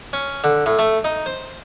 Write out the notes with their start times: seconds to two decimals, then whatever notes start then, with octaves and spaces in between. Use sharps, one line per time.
0.13 C#4
0.44 D3
0.66 A2
0.79 A3
1.04 D#4
1.26 C5